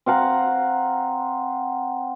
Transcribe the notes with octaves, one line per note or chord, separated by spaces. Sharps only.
C4 F5 F#5 A#5